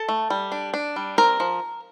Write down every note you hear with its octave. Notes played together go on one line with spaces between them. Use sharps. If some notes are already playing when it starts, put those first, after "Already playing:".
Already playing: A4 A5
A3
G3
D4
D4
G3
C4 A#4 A#5
F3